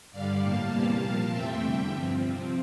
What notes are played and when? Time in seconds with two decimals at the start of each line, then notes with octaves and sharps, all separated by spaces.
0.12 G2 D3 G3 D5 F5
0.42 A2 G3 A#3 F5 A5
0.72 E2 C3 E3 G3 A#3
1.02 A#2 F3 A#3
1.32 F2 C3 E3 A3 C4 E5 G5
1.62 E2 D3 G3 E5 G5
1.92 G2 F3 C4
2.22 C3 F3 C4